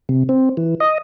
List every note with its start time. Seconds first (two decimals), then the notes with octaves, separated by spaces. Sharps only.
0.09 C3
0.29 C4
0.57 E3
0.80 D#5